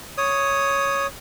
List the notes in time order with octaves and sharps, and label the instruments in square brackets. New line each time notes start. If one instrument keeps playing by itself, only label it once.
[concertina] C#5 D#6